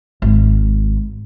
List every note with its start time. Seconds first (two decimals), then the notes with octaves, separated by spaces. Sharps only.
0.22 G#1